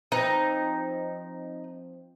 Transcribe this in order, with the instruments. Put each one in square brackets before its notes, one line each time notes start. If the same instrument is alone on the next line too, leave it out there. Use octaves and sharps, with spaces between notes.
[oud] F3 C4 B4 [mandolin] D#4